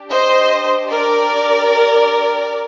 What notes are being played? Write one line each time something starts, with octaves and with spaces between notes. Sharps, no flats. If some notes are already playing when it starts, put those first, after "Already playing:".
Already playing: D4 G4
C5 D#5
A#4 D5